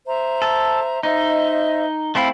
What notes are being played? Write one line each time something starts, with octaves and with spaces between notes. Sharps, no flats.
C5 E5 A#5
A4
D#4 C5 D#5 E5
A3 C4 E4 F5